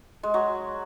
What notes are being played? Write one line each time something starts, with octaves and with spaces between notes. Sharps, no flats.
G#3
F#3